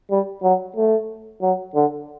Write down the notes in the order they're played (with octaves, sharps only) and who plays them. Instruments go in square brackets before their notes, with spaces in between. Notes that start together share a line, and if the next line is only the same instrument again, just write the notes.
[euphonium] G3
F#3
A3
F#3
D3